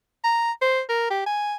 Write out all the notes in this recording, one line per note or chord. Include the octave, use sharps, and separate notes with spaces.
A#5
C5
A#4
G4
G#5